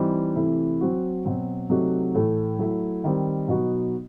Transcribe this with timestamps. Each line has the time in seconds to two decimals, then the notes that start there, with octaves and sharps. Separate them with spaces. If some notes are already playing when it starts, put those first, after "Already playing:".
Already playing: E3 G3 C4 D#4
0.36 C3 E3 A3 E4
0.81 F#3 C4 F#4
1.25 B2 F#3 C4
1.70 C3 F#3 A3 D#4 F#4
2.15 A2 E3 A3
2.59 F#3 A3 E4
3.04 D#3 G3 C4
3.48 B2 F#3 B3 D#4 F#4